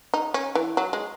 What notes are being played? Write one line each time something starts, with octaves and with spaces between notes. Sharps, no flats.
D#4
C#4
E3
F#3
G#3